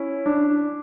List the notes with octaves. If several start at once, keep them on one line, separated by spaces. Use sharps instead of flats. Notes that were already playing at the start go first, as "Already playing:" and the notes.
Already playing: C#4 E4
D4